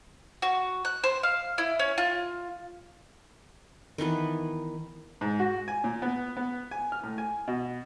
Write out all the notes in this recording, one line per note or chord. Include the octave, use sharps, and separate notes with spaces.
F#4
F#6
C5
F5
E4
C#4
F4
D#3 E3 B3 B4
G#2
F#4
G#5
A#2
B3
B3
G#5
F6
A2
G#5
B2